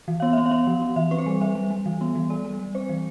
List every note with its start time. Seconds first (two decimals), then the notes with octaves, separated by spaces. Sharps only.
0.08 E3
0.20 B3 F5
0.33 B3 E5
0.46 F5
0.51 B3
0.67 F3
0.82 B3
0.96 E3 E5
1.11 C4 B4
1.18 C5
1.26 G3
1.41 G3 E5
1.55 G3
1.70 G3
1.86 E3
2.01 B3
2.15 E3
2.30 G3 D5
2.45 G3
2.59 G3
2.75 C4 C5
2.89 E3